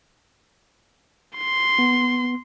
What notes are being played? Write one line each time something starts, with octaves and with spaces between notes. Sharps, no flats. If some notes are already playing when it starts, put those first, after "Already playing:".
C6
B3